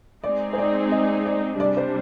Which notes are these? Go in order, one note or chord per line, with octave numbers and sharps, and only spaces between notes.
G#3 C4 D#4 G#4 D5
C5
D5
D#5
D5
C3 G3 D4 D5
C5